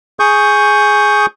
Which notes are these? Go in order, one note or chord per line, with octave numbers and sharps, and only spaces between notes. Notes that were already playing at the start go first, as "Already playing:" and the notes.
G#4 C#6 D#6 G6